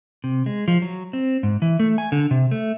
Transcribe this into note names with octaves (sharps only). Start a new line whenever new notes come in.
C3
G#3
F3
F#3
C4
G#2
E3
A3
G#5
D3
C3
A3